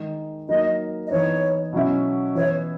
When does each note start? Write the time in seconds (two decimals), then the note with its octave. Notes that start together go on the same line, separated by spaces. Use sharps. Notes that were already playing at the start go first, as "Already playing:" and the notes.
Already playing: D#3 G#3 D#4
0.49 F#3 A#3 D#4 D#5
1.06 D#5
1.11 E3 B3 D#4 C#5
1.73 B2 F#3 C#4 E4
2.35 E3 B3 E4 C#5